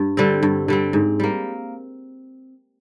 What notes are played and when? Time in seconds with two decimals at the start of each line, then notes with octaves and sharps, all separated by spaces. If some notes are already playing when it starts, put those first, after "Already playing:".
Already playing: G2
0.17 D3 G3 C4
0.43 G2
0.68 D3 G3 C4
0.93 G#2
1.20 G3 A#3